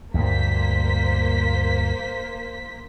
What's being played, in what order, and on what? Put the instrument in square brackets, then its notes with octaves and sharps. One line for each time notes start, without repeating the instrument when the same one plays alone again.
[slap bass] D2 G2 [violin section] A#3 C5 B6